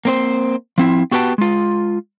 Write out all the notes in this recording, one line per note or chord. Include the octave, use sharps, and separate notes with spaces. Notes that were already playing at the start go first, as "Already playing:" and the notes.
A#3 C4 C5
F3 C4 E4
B3 F#4 G4 B4 G5 A5
G#3 F4